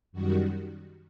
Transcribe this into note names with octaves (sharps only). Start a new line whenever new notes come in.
F#2 D#3 G3 F#4